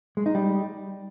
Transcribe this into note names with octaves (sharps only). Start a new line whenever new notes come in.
G#3
D#4
G3